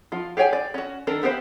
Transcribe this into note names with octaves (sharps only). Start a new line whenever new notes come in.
F3 F4
G4 G#4 C#5 G5 G#5
D5
C#4 F#4
D#3 D4 A4 A#4
B3 G4 A#4 C5 F5